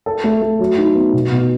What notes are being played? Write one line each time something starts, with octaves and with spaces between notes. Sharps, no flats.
A4
A3
A3
F#3
D#4
B3
B2
B2